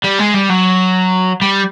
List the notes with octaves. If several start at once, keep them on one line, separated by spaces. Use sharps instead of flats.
G3
G#3
G3
F#3
G3